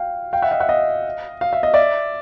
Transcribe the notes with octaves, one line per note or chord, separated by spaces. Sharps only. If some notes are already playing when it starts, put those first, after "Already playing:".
Already playing: F5 G5
F5 G5
E5 F#5
D#5 F5
E5 F#5
D#5 F5
F5
E5
D#5
D5 E5